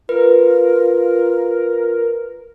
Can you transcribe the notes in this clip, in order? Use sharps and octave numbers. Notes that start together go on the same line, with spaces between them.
F4 A#4 B4